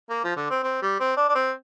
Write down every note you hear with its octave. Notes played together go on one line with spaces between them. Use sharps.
A#3
F3
D3
C4
C4
G3
C4
D4
D4
C4